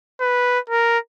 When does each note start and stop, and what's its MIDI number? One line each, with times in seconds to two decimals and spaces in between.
0.20 0.59 71
0.70 0.99 70